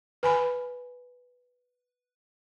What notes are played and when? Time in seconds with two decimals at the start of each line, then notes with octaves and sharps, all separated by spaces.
0.23 B4 G#5 B5